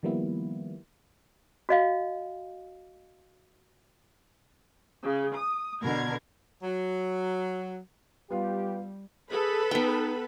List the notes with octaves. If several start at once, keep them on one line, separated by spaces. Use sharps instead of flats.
D#3 F3 G3 A#3 B3 E4
F#4 D#5 F5
C#3
D#6
B2 D3 A#4 G#6
F#3
G3 B3 F4 G4 F5
G#4 A4 B4 B5
B3 D#4 G5